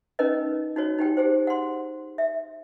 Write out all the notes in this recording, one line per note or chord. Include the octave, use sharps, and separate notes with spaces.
C#4 D#4 A#4 B4 D#5
D#4 F#4 C#5
D#4 G4 G5
G4 G#4 C5
F#5 C6
E5